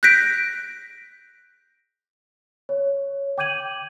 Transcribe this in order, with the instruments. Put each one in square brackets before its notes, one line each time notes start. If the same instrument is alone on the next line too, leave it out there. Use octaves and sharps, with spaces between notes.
[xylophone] F#6 G6 A#6 B6 D7
[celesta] C#5
G5 D6 G6 G#6 D#7 F#7